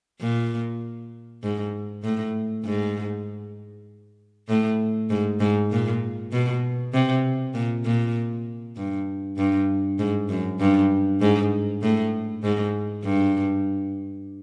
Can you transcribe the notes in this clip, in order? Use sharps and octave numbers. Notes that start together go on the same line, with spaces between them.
A#2
G#2
A2
G#2
A2
G#2
G#2
A#2
B2
C3
A#2
A#2
G2
G2
G#2
F#2
G2
G#2
A2
G#2
G2